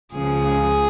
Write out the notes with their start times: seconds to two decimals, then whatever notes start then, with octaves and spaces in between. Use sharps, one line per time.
0.13 C#2 C#3 F3 G#4